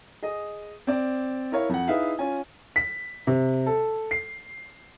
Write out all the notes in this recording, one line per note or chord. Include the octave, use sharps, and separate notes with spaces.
G#4 D#5
C4 D5
E4 A#4 C#5 F5
F2 F#5
D#4 E4 G#4 B4 E5 F5
C#4 F4 G#5
B6
C3
A4
C7